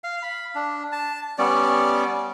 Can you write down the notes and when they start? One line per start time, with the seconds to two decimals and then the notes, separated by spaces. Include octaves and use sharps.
0.04 F5
0.23 B5
0.55 D4
0.92 A5
1.38 G3 B3 C#4 D5